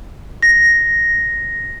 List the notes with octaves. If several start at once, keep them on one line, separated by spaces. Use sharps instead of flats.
A#6